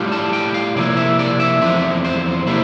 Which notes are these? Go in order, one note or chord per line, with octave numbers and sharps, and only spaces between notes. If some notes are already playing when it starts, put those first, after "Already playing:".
Already playing: A2 G3 D4 F4
A5
G5
F5
C3 F3 A#3 E4 D5
E5
D5
E5
E2 D3 F3 C4 E5
C5
C3 G3 A#3 E4 E5